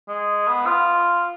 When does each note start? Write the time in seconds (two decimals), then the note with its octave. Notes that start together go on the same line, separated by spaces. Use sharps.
0.08 G#3
0.48 B3
0.66 F4